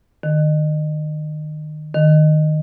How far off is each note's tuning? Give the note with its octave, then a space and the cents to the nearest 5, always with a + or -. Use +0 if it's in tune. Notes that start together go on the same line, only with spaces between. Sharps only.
D#3 -30
D#3 -15